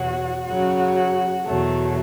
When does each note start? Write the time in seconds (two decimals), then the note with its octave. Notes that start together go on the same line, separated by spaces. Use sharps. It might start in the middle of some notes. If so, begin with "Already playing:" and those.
Already playing: E2 B2 F#3 F#4
0.46 F#2 C#3 F#3 F#4
1.45 E2 B2 F#3 A3